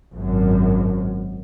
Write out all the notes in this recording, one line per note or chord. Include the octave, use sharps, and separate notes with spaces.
G#1 F#2